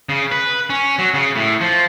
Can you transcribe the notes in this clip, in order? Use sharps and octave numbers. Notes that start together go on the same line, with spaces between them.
C#3
B4
C#4
F#3
C#3
A2
F3